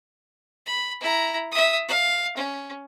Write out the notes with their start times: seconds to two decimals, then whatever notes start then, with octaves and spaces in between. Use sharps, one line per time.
0.66 B5
1.01 E4 A#5
1.51 E5 D#6
1.89 F5
2.37 C#4